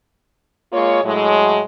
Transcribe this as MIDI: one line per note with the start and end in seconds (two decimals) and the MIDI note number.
0.73 1.03 56
0.73 1.03 58
0.73 1.03 65
0.73 1.03 73
1.04 1.62 45
1.04 1.62 54
1.04 1.62 56